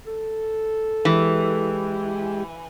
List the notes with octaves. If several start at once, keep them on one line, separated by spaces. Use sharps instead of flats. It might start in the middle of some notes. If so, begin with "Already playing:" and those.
A4
E3 G#3 G4